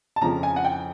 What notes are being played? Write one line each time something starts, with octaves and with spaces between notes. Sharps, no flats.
A5
F2 C#3 F3 A#5
G#5
F#5
G5